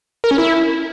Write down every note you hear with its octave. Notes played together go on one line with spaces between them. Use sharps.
A#4
C#4
E4